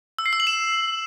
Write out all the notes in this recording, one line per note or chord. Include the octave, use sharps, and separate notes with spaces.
E6
C7
E6
F#7
E7